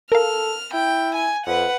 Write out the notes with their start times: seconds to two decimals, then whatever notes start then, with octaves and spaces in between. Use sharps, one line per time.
0.12 A4 A#4 F5 F6
0.74 E4 G5
1.15 G#5
1.46 F2 B4 F#5